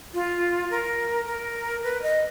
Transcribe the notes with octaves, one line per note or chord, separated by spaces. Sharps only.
F4
A#4
A#4
B4
D#5